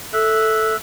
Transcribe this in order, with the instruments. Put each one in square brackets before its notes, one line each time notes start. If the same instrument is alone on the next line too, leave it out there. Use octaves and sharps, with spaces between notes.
[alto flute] A4 [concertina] E5 F#6